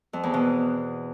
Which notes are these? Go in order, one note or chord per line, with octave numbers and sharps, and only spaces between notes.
F2
E2
B2